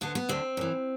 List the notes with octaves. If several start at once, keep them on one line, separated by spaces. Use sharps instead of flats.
D2 D3 B3
B3
D2 D3 C4
F#2 E3